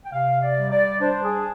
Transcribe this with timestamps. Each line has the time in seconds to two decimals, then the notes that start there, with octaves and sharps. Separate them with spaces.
0.05 G5
0.12 C3 F5
0.42 D5
0.56 G3
0.71 D5
1.01 D4 C5
1.23 G#4